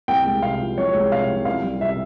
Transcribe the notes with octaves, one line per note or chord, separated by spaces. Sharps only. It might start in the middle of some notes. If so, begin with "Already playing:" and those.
C2 G5
G#3
C3 F5
F3
C2 C#5
G#3
C3 F5
F3
C2 F5
G3
C3 E5